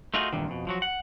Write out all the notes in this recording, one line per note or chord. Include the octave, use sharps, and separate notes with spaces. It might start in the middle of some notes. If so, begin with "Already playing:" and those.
A3 D#4 F4 F#4 G#4
E2 G2 A#2 D3 D#3
F2 B2
F3 F#3 F#4
F#5